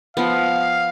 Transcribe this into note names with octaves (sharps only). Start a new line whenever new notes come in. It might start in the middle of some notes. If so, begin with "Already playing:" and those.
F3 B3 F5